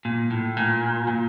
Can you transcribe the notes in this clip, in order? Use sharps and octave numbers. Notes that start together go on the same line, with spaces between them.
A#2
A2
A#2
A#2